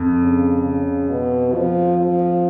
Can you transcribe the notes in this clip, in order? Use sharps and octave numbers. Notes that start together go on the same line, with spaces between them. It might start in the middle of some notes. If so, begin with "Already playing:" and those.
Already playing: F2
C#3
C#3
B2
F3
F3